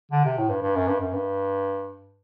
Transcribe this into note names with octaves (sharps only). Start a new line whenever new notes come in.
D3
C3
A2
G2
G2
F#2
G2
F#2
G2